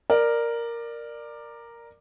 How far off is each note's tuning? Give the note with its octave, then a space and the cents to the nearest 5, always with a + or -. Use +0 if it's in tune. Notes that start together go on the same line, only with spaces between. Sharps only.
A#4 +0 D5 +15